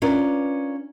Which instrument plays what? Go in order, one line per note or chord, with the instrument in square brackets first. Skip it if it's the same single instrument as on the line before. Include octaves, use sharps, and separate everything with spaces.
[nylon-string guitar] C#4 D4 F4 A#4 B4 D5